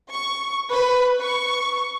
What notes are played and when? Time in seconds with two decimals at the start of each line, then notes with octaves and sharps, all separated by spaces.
0.10 C#6
0.70 B4
1.22 C#6